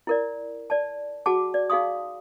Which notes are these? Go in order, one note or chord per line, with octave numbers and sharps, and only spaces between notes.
E4 A#4 D5
D5 A5
F#4 G#4 F#5 A5 D6
D5
D#4 G#4 F5 C6 D#6